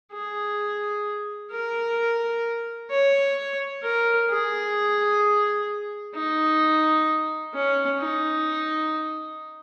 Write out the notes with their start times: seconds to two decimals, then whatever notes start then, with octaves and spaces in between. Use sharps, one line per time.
0.13 G#4
1.51 A#4
2.90 C#5
3.83 A#4
4.29 G#4
6.15 D#4
7.54 C#4
7.99 D#4